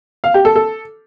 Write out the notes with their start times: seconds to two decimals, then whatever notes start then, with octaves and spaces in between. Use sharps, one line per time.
0.24 F5
0.34 G4
0.45 A4
0.56 A4